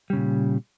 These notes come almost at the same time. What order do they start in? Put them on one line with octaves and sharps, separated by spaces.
G3 C#3 A#2